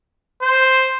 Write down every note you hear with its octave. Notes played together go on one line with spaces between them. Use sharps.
C5